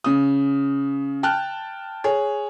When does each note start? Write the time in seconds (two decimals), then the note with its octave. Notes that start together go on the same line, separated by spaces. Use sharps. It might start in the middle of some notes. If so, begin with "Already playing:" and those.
0.04 C#3 D#6
1.23 G5 A5 F6 F#6
2.04 G#4 C#5